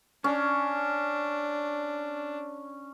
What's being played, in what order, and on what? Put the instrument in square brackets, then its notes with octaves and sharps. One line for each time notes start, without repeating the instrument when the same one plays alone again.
[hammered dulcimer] C#4 [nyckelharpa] D4